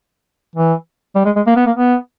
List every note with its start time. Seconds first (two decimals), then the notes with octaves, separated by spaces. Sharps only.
0.55 E3
1.15 G3
1.25 G#3
1.36 G#3
1.47 A#3
1.56 B3
1.66 A#3
1.76 B3